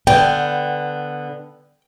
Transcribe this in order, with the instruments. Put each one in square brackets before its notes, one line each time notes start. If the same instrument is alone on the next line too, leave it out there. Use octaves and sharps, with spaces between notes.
[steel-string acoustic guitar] D3 B3 [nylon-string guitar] G5